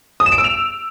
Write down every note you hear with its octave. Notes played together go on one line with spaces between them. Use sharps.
D#6
E7
D7
E6
F7